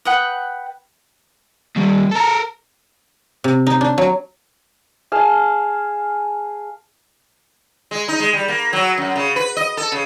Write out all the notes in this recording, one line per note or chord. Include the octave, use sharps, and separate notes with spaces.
B4 F#5 G5 D#6
D#2 G3
A4 A#4
C3
D#4
D4
F#3
G#4 F5 A5
G#3
D#4
G#3
G3
A#3
F#3
F#2
C#3
B4
D#5
A4
C#3